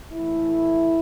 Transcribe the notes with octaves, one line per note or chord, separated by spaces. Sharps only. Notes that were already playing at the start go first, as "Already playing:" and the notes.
A2 E3 A3 E4